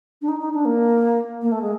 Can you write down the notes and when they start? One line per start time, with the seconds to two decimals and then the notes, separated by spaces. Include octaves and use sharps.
0.21 D4
0.28 D#4
0.40 D#4
0.53 D4
0.65 A#3
1.41 A#3
1.51 A3
1.61 G#3